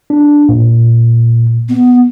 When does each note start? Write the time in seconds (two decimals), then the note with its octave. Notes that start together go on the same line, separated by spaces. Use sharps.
0.10 D4
0.49 A#2
1.69 B3